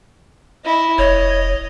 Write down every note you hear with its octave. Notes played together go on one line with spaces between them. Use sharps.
E4 D#5
F1 C#5 D#5